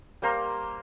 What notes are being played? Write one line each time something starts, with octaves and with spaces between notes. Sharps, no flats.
G3 A#3 C5 A#5